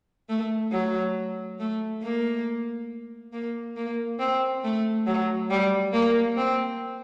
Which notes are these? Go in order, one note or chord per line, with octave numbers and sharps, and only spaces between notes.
A3
F#3
A3
A#3
A#3
A#3
C4
A3
F#3
G3
A#3
C4